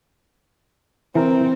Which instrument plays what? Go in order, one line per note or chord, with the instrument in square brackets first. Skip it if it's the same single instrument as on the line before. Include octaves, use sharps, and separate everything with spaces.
[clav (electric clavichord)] E3 A#4 [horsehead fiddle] C4